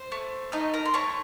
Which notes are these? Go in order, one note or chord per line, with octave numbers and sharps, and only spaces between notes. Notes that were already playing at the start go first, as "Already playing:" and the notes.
Already playing: C5
A3
A3 D#4 D#5
A#4 A#5
C6
A3 C#5 C#6